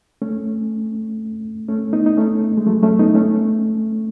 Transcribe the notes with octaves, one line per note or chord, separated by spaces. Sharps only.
A3 C#4
A3 C#4
B3 D#4
D#4
A3 C#4
G#3
F#3 A3
A3 C#4
B3 D#4
A3 C#4